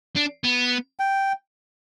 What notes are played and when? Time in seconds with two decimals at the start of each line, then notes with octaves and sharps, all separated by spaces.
0.17 D4
0.44 B3
0.99 G5